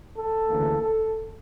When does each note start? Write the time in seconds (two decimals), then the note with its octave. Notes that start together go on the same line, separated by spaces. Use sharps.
0.15 A4
0.48 D2 C#3 E3 A#3
0.81 A4